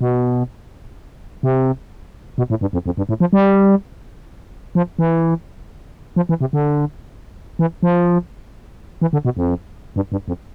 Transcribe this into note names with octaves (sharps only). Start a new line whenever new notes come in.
B2
C3
B2
A2
G2
F2
F2
G2
A2
F3
G3
F3
E3
F3
E3
C3
D3
E3
F3
E3
D3
B2
F2
G2
G2
F2